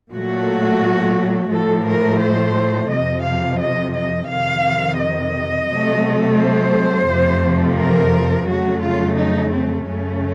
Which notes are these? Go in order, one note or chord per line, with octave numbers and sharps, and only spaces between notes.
A#2 F#3 A3 F#4
A2 F3 A3 A4
A#4
C5
F2 C3 F3 D#5
F5
D#5
D#5
F2 C3 D#3 F5
D#5
C3 F#3 A3
C5
F2 C3 F3 A3
A#4
F2 C#3 F#3 A3 F#4
F4
D#4
C4
F#2 C#3 A3 C#4